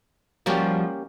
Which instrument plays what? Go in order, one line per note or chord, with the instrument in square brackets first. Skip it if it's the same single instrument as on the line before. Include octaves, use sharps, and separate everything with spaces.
[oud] F3 G3 F#4 [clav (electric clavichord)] A#3 C#4 G4